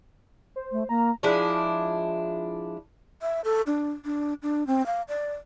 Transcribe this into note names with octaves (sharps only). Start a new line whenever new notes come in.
C5
A3
A#3 A#5
F3 G#3 D4 E4
E5
A4
D4
D4
D4
C4
F5
D5